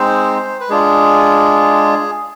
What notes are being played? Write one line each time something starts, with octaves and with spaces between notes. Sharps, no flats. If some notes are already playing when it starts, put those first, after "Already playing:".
Already playing: G#3 C4 D#4 C5
B4
G#3 D4 F4 G#4